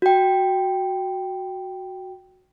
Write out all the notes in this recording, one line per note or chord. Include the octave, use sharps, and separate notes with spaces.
F#4 G5